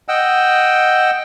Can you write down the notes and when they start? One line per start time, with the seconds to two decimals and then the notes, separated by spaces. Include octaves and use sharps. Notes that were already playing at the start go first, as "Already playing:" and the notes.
0.08 D#5 F#5 G5 E6